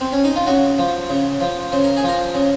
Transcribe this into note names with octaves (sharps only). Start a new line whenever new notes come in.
C4
C#4
D#4
F4
C#3 F#4
F3
C#3
F3
C#3 C5
A#4
G#4
F3 A#4
C#3